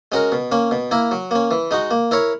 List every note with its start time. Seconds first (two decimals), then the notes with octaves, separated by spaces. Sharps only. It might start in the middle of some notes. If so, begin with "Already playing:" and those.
0.12 G#3 C#4 F#4 A#4
0.32 B2
0.52 A#3 C#4
0.71 B2
0.91 A#3 E4 A#4
1.11 F#3
1.31 A#3 C#4
1.51 E3
1.71 G#3 D#4 F#4
1.91 A#3
2.11 E4 A#4 C#5